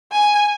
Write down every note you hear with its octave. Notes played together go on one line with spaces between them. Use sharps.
G#5